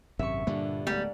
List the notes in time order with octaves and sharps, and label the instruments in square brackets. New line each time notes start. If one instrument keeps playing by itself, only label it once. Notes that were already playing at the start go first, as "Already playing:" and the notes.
[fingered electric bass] G#1 F#2 C3 [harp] E5 C#6
[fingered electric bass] G2 [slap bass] A#2 G3 A#3 [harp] D3
[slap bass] D1 A3 B3 [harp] G#2 [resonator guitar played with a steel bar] G3